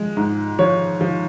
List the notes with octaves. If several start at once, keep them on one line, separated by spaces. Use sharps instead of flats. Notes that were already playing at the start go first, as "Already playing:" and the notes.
Already playing: F3 G#3
G#2
F3 C#5
F3